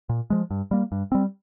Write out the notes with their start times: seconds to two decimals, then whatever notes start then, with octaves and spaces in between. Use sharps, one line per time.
0.09 A#2
0.30 F3 G#3
0.51 G2
0.71 G3 A#3
0.92 G2
1.12 G3 C4